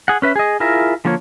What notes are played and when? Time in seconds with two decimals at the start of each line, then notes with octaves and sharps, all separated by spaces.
0.08 G#4 F#5
0.22 C#4 B4 E5
0.36 G#4 D#5
0.60 E4 F4 G#4 A#4 E5
1.05 D3 F3 A#3 F4 C#5